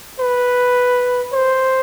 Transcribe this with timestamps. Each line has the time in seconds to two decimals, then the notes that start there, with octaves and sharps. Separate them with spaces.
0.20 B4
1.33 C5